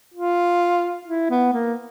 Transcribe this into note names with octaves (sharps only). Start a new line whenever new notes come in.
F4
E4
B3
A#3